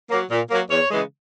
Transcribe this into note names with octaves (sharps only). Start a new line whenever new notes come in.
F#3 A#3
A#2
F#3 A#3
E2 C#5
C#3 E3 G#3